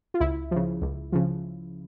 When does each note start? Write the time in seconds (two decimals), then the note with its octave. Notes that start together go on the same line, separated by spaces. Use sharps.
0.14 F4
0.20 C#2 E4
0.51 C#3 F3
0.82 C#2
1.12 C#3 F3